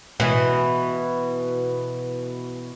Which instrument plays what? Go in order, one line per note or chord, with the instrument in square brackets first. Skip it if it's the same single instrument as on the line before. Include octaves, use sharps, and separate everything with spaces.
[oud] B2 E3